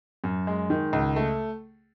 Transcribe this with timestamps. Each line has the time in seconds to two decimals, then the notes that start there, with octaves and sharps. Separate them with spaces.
0.24 F#2
0.47 G#3
0.70 D#3
0.93 C#2
1.16 A3